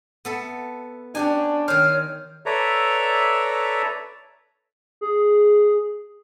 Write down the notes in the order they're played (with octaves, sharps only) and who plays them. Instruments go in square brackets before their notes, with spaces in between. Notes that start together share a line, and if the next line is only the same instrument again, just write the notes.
[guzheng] B3 A4 E5
[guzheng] C#4 G4 G#5 [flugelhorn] D4
[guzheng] D#3 C5 [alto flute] C#5 [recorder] F6
[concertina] A4 B4 C#5 D5 E5 A#5
[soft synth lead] G#4